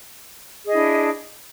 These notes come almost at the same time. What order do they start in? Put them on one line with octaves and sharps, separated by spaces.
G#4 D#5 E4 D4